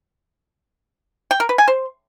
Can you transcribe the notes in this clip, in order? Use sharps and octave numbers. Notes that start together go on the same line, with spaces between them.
G5
A#4
B4
G#5
C5